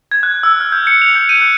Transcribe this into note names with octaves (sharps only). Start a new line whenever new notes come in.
G#6
F#6
E6
F6
G6
C#7
F7
G6
D#7
F#6